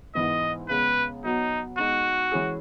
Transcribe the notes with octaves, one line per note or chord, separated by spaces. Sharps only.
G#2 E3 B3 E4 D#5
E2 C#3 G#3 B3 B4
B2 F#3 B3 D#4
B2 G#3 D#4 F#4
E3 G#3 C#4 E4 G#4